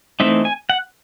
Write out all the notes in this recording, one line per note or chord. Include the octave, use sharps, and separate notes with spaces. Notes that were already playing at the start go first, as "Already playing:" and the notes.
E3 A3 C4 D#4 E5
G#5
F#5